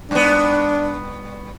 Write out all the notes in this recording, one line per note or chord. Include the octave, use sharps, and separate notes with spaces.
G2 B3 D4